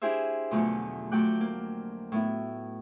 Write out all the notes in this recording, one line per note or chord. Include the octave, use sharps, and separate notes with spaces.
D4 E4 G4 G#4 C5 E5
E2 B2 D3 F3 F#3 A3
F2 F#3 A3 G5 D6 F#6
A#3
A2 B3 E4